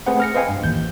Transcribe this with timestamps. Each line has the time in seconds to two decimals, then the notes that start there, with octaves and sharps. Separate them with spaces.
0.06 A3 C4 G#4 B4 C5 F#5
0.20 F6 A#6 C#7
0.34 B4 C5 D#5 F5 G5 G#5
0.49 G2
0.61 A1 D#2 G6